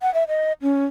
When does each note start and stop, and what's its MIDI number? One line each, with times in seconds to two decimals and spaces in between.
0.02 0.12 78
0.14 0.24 76
0.28 0.52 75
0.62 0.85 61